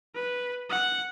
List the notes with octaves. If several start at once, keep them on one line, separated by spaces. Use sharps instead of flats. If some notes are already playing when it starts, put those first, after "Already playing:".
B4
F#5